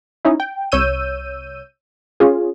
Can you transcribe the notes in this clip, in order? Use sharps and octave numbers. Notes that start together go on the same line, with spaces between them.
C#4 D#4 E4
G5
C2 C#5 E6 G6 D#7
C#4 F4 G#4